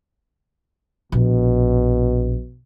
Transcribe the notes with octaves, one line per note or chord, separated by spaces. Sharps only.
A#1 B2